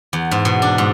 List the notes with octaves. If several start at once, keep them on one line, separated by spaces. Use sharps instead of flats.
E2
G#2
B2
D4
G#2